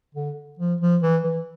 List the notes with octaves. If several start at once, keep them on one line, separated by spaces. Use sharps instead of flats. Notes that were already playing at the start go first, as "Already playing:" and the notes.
D3
F3
F3
E3
E3